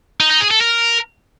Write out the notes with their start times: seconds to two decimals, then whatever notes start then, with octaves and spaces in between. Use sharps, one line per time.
0.20 D#4
0.30 D#4
0.41 G#4
0.51 A4
0.61 A#4